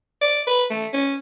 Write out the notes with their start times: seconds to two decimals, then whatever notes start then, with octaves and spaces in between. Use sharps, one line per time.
0.22 D5
0.47 B4
0.71 A3
0.94 C#4